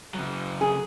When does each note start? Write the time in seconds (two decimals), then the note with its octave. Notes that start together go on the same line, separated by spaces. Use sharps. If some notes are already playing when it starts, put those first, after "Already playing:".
0.14 C#3 F#3
0.61 G#4